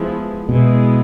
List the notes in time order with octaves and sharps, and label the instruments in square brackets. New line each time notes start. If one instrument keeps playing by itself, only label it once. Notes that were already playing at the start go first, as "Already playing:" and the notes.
Already playing: [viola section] F3 G#3 B3 E4
[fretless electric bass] B2 [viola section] G#3 B3 E4 G#4